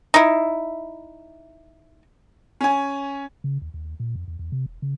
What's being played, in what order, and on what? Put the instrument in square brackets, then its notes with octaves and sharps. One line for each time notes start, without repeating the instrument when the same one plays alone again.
[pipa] D#4 E4
[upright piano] C#4 G#5
[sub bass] C#3
D#2
D#2
A#2
F2
E2
E2
C3
E1
C#3